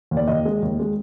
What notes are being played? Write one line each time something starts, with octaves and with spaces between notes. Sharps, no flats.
D#2
D5
D#2 D#5
G#3
D#2
G#3